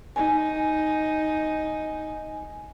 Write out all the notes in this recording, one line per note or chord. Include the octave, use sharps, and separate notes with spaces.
D#4 G#5